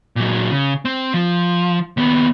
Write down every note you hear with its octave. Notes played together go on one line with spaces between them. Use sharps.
A#2 F#3
C#3
C4
F3
D#2 B3